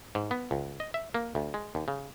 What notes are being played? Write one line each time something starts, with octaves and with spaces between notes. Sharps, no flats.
G#2
B3
C#2
D#5
E5
A#3
D2
G#3
D#2
C#3